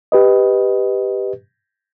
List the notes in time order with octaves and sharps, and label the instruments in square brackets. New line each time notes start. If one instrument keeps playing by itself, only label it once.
[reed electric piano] G4 B4 D#5